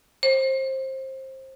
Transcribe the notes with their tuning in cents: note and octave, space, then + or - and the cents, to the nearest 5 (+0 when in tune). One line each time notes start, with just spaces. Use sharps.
C5 +20